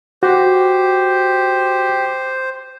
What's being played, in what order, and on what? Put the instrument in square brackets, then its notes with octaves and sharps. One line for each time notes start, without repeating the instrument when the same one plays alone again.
[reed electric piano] F#4 [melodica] G4 [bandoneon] C5